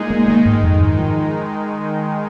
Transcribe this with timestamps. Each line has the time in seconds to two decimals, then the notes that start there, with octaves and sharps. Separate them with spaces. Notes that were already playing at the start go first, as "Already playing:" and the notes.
Already playing: A#2 G#3 D#4 G#4
0.10 A#3
0.28 D#3 G#3 A#3 D#4
0.46 G#2
0.63 F2
0.80 G#2
0.98 F3